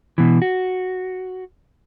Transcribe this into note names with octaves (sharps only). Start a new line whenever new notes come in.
B2 E3
F#4